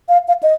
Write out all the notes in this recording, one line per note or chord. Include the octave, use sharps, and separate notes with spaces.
F5
F5
D#5